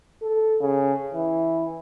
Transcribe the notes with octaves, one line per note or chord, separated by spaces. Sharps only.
A4
C#3
E3